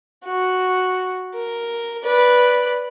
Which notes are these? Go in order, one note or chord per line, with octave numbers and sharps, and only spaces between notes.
F#4
A#4
B4 D5